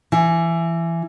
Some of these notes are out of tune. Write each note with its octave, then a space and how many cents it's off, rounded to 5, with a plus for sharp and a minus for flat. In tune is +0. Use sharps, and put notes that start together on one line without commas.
E3 +20